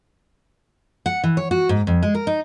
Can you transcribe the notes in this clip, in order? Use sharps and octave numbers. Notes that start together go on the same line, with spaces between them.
F#5
E3
C#5
F#4
G#2
F2
G#3
A#4
D#4